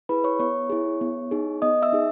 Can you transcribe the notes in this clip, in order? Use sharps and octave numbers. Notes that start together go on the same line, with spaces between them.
E4 G#4 B4 B5
C#5 C#6
B3 C#5 C#6
E4 G#4
B3
D#4 G#4
B3 D#5 D#6
E5 E6
D#4 G#4